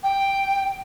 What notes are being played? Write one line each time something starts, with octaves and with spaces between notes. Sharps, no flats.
G5